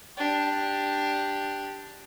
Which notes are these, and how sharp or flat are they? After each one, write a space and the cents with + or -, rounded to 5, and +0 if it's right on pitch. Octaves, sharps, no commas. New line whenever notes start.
D4 +0 G4 +0